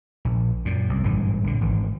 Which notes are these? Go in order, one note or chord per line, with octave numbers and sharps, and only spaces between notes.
A#1
F#2 A#2
C2
G#1 G2 A#2 E3
A#1 D3
G#1 E3